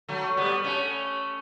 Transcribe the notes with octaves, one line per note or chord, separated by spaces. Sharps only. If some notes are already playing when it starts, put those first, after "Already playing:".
F#3 A3
G3 B3
A3 C#4